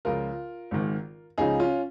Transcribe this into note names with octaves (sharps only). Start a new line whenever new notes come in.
C#2 C#3 F3 F4 A#4
G#1 G#2 D#3
C#2 C#3 F3 D#4 G#4
C#4 F4